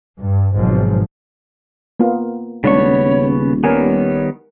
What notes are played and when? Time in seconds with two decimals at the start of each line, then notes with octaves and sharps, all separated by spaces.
0.18 G2
0.55 G#1 G#2 B2 F3 F#3
2.00 A#3 B3 F4
2.64 D#1 C#3 G#3 B3 D4 C#5 C#6
3.64 D#3 G3 B3 A#4 C#5 G#5